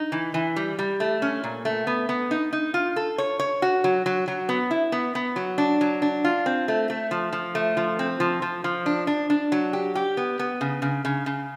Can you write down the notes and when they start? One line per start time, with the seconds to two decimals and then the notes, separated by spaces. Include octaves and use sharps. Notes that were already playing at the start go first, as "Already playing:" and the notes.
Already playing: D#4
0.12 E3
0.34 E3
0.56 G3
0.79 G3
1.00 A3
1.22 C#4
1.44 A#2
1.65 A3
1.87 B3
2.09 B3
2.31 D#4
2.53 D#4
2.74 F4
2.96 A4
3.18 C#5
3.39 C#5
3.62 F#4
3.84 F#3
4.06 F#3
4.28 F#3
4.49 B3
4.71 E4
4.92 B3
5.15 B3
5.36 F#3
5.58 D4
5.81 F#3
6.02 D4
6.24 F4
6.46 C4
6.68 A3
6.90 A3
7.11 F3
7.33 F3
7.55 A3
7.77 F3
7.99 C4
8.20 F3
8.42 F3
8.64 F3
8.86 D4
9.07 D4
9.30 D4
9.52 F#3
9.73 G4
9.95 G4
10.17 B3
10.39 B3
10.61 C#3
10.82 C#3
11.05 C#3
11.26 C#3